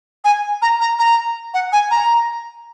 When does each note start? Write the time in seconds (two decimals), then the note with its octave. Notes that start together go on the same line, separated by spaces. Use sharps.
0.25 G#5
0.62 A#5
0.81 A#5
0.99 A#5
1.54 F#5
1.73 G#5
1.91 A#5